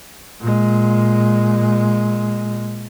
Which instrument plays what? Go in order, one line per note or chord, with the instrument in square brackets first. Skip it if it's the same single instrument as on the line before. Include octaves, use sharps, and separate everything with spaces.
[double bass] A#2 G#3